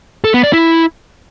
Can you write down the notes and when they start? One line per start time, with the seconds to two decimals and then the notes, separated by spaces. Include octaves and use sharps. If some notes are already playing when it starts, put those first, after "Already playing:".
0.24 A4
0.34 B3
0.43 D5
0.53 E4